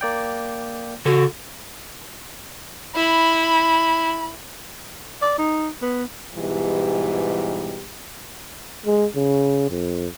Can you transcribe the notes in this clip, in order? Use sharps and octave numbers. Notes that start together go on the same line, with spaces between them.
A#3 D5 G5
C#3 F#4 A4
E4 B5
D5
D#4
B3
G#2 B2 E3 G3 G4
G#3
C#3
F2